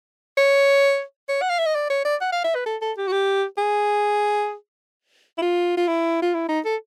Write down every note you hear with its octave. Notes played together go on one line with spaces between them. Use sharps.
C#5
C#5
F#5
F5
E5
D#5
D5
C#5
D5
F#5
F5
E5
B4
A4
A4
G4
F#4
G4
G#4
E4
F4
F4
E4
F4
E4
D#4
A4